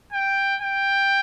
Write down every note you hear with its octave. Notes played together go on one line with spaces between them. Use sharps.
G5
G5